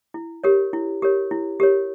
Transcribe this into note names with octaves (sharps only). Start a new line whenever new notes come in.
E4
G4 A#4 C#5
E4
G4 A#4 C#5
E4
G4 A#4 C#5